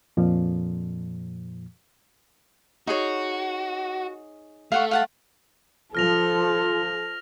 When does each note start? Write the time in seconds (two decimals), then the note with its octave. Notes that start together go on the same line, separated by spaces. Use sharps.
0.17 F2 A#2 F3
2.87 D#4 F#4 G#4 C#5
4.72 A3 F5 F#5 C#6
4.91 F5 F#5 A5
5.95 F3 F4 A4 F6 A#6 F7